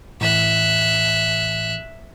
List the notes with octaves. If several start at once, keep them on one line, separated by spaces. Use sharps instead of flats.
A2 E3 E5 F#6